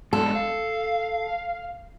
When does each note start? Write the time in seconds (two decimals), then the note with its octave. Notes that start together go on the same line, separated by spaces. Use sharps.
0.13 G#3 B3 D4 A4
0.35 F5